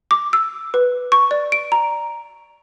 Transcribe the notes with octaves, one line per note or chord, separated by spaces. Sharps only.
D6
E6
B4
C#6
D5
D7
A#5